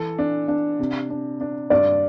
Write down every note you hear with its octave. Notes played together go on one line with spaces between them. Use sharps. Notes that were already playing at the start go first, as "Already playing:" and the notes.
Already playing: E3 A4
D4
D4
C3
D4
D4
G2 D5